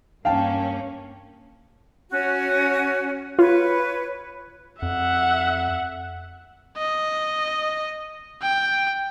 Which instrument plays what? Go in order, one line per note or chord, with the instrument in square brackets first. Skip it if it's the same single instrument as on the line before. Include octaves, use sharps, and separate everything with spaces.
[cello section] G2 A#3 C#4 [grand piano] F5 G5 A5
[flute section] C#4 F#4
[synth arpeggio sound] F4 [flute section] B4 C#5
[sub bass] F2 [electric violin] E5 F#5
[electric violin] D#5
G5